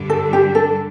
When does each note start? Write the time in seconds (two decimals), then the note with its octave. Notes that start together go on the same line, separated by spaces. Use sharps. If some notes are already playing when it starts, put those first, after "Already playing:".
Already playing: G2 D3 G3 D4
0.10 A4
0.33 G4
0.55 A4